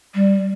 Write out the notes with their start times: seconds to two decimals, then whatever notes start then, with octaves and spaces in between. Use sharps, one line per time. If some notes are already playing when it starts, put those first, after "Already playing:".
0.14 G3